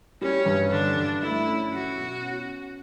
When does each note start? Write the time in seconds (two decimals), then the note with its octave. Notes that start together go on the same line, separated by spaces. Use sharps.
0.21 G3 C#4
0.46 G2
0.72 D3 D4
0.96 G2
1.22 A3 E4
1.47 C#4
1.72 F#3 F#4
1.97 B2
2.22 C#4